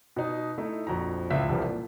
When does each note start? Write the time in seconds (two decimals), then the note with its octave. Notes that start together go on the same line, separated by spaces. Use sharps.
0.16 B2 D#4
0.58 A3 D#4 E4
0.87 A#1 F2 F#4 A#5
1.30 D1 C#2 E5 B6
1.49 E1 C2 F3 G3 B4
1.68 A#2